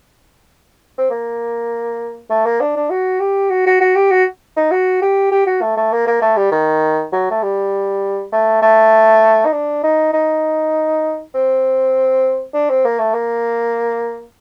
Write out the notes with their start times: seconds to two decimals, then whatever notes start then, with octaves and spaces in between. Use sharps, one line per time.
0.98 C4
1.10 A#3
2.30 A3
2.45 A#3
2.61 D4
2.76 D4
2.90 F#4
3.20 G4
3.50 F#4
3.66 F#4
3.81 F#4
3.96 G4
4.11 F#4
4.56 D#4
4.71 F#4
5.02 G4
5.32 G4
5.46 F#4
5.61 A3
5.77 A3
5.92 A#3
6.07 A#3
6.22 A3
6.37 G3
6.52 D#3
7.12 F#3
7.31 A3
7.43 G3
8.32 A3
8.62 A3
9.46 D#4
9.53 D4
9.83 D#4
10.13 D#4
11.34 C4
12.54 D4
12.70 C4
12.85 A#3
12.99 A3
13.14 A#3